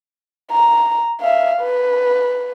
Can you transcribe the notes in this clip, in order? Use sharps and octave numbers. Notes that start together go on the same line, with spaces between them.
A#5
E5 F5
B4